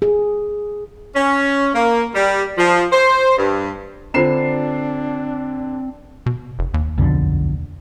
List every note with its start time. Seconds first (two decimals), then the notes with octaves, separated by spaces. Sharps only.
0.02 G#4
1.16 C#4
1.75 A#3
2.15 G3
2.58 F3
2.92 C5
3.38 G2
4.14 D3 C4 D4 F4 C5 A#5 C7 E7
6.26 B2
6.59 F1
6.74 D#2
6.98 B1 F2 D3